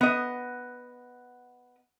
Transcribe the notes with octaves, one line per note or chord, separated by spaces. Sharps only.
B3 D#5